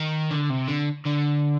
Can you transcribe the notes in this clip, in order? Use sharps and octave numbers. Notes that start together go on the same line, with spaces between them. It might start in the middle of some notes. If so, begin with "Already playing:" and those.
Already playing: D#3
D3
C3
D3
D3